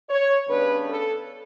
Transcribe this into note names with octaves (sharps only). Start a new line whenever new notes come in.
C#5
C#3 G3 B3 D4 B4
A4